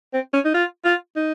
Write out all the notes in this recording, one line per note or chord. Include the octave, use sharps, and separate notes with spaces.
C4
C#4
D#4
F4
F4
D#4